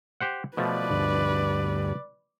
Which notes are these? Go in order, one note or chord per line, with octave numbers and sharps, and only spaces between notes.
G4 C5 F#5
B2 F3 A3 B4 D5
D2 G2